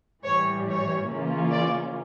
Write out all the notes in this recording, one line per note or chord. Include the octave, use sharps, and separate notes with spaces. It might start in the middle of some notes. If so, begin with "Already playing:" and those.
A2 E3 G3 C#5
C#5
C#3 E3 A#3 C#4 F4
D5